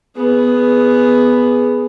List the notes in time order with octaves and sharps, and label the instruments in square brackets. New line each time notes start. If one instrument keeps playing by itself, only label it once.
[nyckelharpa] B3 G#4